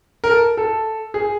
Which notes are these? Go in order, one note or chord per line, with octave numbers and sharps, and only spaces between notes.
A#4
A4
A4
G#4